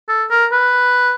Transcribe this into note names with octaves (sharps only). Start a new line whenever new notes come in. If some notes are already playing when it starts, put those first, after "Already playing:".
A4
A#4
B4